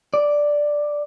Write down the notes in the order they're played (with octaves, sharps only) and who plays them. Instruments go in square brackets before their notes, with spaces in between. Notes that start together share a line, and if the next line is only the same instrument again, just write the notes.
[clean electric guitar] D5